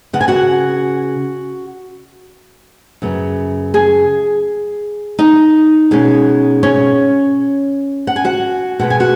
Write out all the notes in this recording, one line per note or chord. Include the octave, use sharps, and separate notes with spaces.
C#3 B3 F#5
G#5
F#4 F#5
F#2 C#3 B3
G#4 G#5
D#4 D#5
B2 G#3 C#4
C#4 C#5
F#5
G#5
F#4 F#5
B2 G#3 B3 F#5
G#5
F#4 F#5